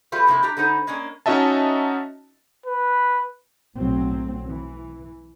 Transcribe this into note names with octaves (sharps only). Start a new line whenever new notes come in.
G3 A3 F4 G4 B4
A2 C3 A#3 E4
D4 G4 A#5
D3 B3 D#4 C5
G#3 A#3 C#4 D4
C#4 D#4 F#4 D#5 E5 A5
B4
B1 A2 F#3 C4
E3